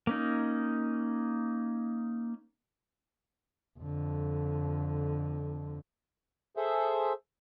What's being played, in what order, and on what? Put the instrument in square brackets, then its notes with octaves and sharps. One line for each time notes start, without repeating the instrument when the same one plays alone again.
[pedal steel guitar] A#3 C#4 D#4
[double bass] F2 D3
[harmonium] G#4 A4 C5 E5